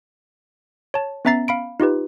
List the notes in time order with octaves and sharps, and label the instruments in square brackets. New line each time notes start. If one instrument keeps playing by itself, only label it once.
[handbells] C#5 A5
B3 C#4 E5 A#5 A6 C7
F5 B5 D7
D#4 F4 G4 B4